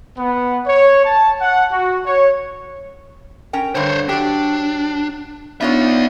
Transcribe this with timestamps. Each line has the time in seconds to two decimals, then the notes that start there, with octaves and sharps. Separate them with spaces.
0.18 B3
0.67 C#5
1.05 A5
1.41 F#5
1.72 F#4
2.05 C#5
3.53 C#4 A#4 G5
3.75 G2 D3 C5 C#5
4.09 F#3 D4 G4
5.61 B3 D4 D#4 F4 C#5 D5 E5